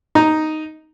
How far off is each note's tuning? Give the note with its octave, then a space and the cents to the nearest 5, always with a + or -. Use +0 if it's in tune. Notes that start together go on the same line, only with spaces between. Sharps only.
D#4 +0 A#5 +0